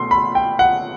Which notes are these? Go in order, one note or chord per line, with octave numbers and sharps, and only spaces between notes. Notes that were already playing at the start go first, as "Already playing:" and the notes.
Already playing: B2 A3 C6
B5
G5
F#5